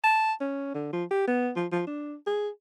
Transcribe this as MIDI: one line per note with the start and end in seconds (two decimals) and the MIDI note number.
0.04 0.33 81
0.40 0.71 61
0.74 0.89 50
0.93 1.04 53
1.11 1.25 67
1.27 1.50 59
1.56 1.67 53
1.72 1.85 53
1.87 2.15 62
2.27 2.49 68